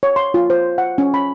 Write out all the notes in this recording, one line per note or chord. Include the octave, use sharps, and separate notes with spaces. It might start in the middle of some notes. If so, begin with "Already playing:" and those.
C#5
C6
F4
C5
F#5
C#4
B5